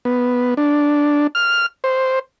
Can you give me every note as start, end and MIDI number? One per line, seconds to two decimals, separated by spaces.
0.05 0.54 59
0.57 1.27 62
1.35 1.66 89
1.84 2.19 72